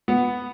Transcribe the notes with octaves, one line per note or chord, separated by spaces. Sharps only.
B3